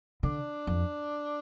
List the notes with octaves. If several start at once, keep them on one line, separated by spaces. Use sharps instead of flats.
D3 D4
F2